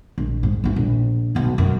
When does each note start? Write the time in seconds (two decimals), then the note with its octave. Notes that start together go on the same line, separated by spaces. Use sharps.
0.18 A#1
0.43 G#2
0.64 A1 E3
0.76 A#1
1.35 B1 A2
1.58 F#2